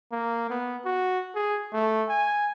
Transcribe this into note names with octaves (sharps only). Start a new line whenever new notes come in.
A#3
B3
F#4
G#4
A3
G#5